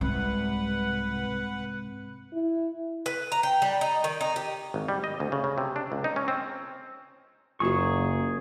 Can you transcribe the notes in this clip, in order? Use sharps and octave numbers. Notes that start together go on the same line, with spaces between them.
C2 G#2 C3 B4 F#5
E4
B4
A#5
G5
G3
D#4
D#3
D#4
G4
G#1
G3
D#5
D2
C#3
C#3
C3
D4
C#2
D#4
C#4
C4
F#1 A#3 F4 F#4 G#4 C#6